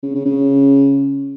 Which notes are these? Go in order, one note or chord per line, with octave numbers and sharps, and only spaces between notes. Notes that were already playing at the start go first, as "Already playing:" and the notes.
C#3
C#3
C#3